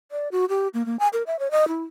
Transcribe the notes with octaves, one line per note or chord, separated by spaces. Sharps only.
D5
F#4
G4
A#3
A#3
G#5
A#4
E5
C#5
D#5
E4